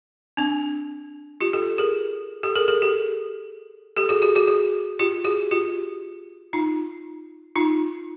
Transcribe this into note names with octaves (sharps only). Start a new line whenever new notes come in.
C4 D4
F4 G4
G4 A4
G#4 A#4
G4 A4
G#4 A#4
G#4 A#4
G4 A4
G4 A4
F#4 G#4
F#4 G#4
F#4 G#4
F#4 G#4
F4 G4
F#4 G#4
F4 G4
D#4 F4
D#4 F4